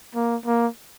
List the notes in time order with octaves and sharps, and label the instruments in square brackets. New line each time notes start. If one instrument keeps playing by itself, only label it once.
[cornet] A#3
A#3